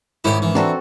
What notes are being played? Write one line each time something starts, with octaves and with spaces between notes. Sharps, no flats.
G#2 D#3 C#4 E4 G4
E3
C4 D4 F#4 A4 A#5